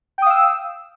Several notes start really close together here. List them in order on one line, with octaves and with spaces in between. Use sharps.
G5 D#6 F5 E6